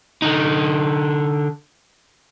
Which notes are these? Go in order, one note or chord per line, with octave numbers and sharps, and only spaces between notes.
D3 D#4